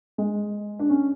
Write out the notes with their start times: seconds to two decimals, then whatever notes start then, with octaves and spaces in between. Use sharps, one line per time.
0.18 G#3
0.79 D4
0.90 C#4